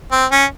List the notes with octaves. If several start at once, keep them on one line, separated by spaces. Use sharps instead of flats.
C4
C#4